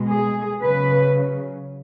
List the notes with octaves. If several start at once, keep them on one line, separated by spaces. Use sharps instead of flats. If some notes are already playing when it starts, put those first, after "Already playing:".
Already playing: B2 G#3
G#4
C#3 F#3 B4